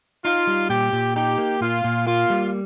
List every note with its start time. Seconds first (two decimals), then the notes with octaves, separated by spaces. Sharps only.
0.25 D#4 F4
0.47 G3
0.69 A#2 G4
0.93 A#2
1.15 D#4 G4
1.38 A#3
1.61 A#2 F4
1.84 A#2
2.06 A#3 F4
2.30 G3